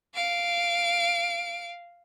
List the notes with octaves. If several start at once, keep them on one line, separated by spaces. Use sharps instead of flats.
F5 D7